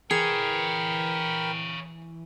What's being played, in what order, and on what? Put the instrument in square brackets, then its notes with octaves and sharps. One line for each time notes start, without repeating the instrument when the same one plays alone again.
[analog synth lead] E3 [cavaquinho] G#4 [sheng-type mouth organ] A#4 G5 B5 [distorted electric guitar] C#5 F5